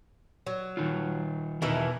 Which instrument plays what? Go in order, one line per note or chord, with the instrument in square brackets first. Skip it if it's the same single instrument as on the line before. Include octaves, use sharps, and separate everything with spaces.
[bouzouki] F#3
[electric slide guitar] D#3 D#4 F4
[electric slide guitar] E2 D#4 E4 [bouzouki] B2 E3 A#4